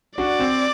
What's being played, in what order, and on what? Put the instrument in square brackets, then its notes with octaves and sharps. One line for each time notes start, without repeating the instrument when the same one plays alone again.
[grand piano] D4 F#4 [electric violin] D5
[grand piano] C4